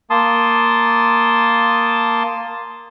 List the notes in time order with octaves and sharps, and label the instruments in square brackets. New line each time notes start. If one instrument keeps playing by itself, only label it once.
[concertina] A#3 A5 C6 D#6